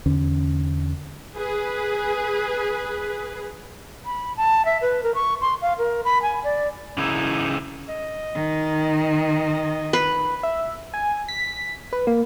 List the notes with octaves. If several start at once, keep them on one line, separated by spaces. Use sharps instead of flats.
E2 D3 C#4
G#4 B4
B5
A5
E5
B4
A#4
C#6
C6
F5
A#4
B5
G#5
D5
C#3 E3 D#4 E4
D#5
D#3
B4
E5
G#5
B6
B4
A#3